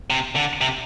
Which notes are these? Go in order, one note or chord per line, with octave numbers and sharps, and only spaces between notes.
C3
D3
C3